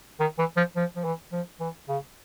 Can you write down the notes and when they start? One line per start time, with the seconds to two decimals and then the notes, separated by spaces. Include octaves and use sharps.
0.20 D#3
0.39 E3
0.57 F3
0.76 F3
0.96 F3
1.04 E3
1.32 F3
1.60 E3
1.88 C#3